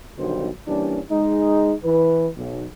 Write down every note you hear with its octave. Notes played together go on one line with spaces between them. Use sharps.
B1 B2 D3 D#3 G3 C5
E3 G3 A#3 C#4 D4
G#3 D#4
E3 B4
B1